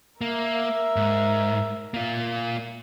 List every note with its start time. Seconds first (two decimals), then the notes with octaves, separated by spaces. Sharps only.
0.21 A#3 A#4 E5
0.96 G#2
1.94 A#3 F4